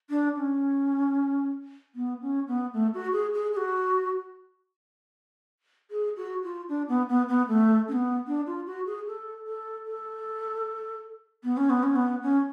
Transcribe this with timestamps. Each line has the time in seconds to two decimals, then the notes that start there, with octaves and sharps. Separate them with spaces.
0.10 D4
0.37 C#4
1.95 B3
2.22 C#4
2.48 B3
2.73 A3
2.94 F#4
3.13 G#4
3.34 G#4
3.53 G#4
3.57 F#4
5.91 G#4
6.16 F#4
6.43 F4
6.69 D4
6.89 B3
7.09 B3
7.29 B3
7.48 A3
7.88 C#4
7.92 B3
8.27 D4
8.47 F4
8.66 F#4
8.86 G#4
9.07 A4
9.47 A4
9.85 A4
11.44 B3
11.57 C#4
11.70 B3
11.83 C#4
11.96 B3
12.23 C#4